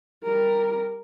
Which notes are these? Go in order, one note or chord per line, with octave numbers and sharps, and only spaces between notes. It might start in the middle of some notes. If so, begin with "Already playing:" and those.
G3 A#4